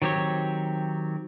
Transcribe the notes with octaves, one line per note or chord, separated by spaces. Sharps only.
D#3 F#3 C4 G4 C#5